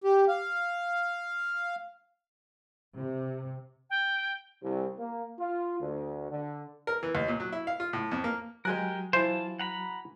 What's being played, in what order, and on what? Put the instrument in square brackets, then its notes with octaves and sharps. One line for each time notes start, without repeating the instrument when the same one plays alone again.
[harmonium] G4
F5
[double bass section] C3
[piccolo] G5
[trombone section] C2
A#3
F4
D2
D3
[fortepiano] A#4
E3
D#2
A#2
F#3
E4
F5
F4
A2
F2
A#3
[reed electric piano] F#3 F#4 [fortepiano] G#3 G#5 F#6 [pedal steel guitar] G4 A#4
[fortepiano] E3 E4 [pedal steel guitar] F4 A5 [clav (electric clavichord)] C5
[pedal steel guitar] F#5 A#5 B5